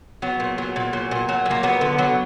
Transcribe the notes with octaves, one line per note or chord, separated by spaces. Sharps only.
F#3 B3
A#2
F#3
A#2
F#3
A#2
F#3
A#2
A#3
F#3 B3
D3
F#3